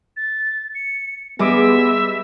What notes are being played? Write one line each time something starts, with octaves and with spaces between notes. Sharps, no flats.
A6
C#7
G3 G#3 B3 E5 D6 D7